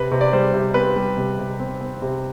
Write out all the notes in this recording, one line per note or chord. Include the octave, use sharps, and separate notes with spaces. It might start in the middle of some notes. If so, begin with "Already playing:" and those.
Already playing: C3 B4
C3
D5
G3 C5
C3
C4 B4
G3
C3
C3
C4
C4
C3